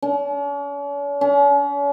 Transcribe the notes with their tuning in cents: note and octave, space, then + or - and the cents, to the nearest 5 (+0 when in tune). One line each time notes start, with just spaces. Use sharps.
C#4 +45
C#4 +40